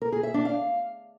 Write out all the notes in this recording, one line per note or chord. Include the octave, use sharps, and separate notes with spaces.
A#4
G#4
E5
D4
F5